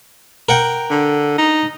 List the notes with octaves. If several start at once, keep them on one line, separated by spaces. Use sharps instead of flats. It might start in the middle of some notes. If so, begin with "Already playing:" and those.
A#4 F#5 G5
D3
D#4